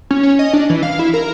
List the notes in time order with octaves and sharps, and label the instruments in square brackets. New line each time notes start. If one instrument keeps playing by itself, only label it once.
[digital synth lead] C#4
C#4
D#5
D4
E3
F5
E4
A#4